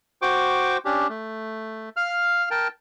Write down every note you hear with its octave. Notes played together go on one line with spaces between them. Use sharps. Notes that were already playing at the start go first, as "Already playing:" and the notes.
F#4 C5 G5 C#6 D6
C#4 D4 G4
A3
F5 F6
A#4 G5 A5